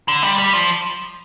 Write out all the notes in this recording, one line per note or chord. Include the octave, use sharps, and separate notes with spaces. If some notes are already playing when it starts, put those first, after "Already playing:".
D3
G3
G3
F3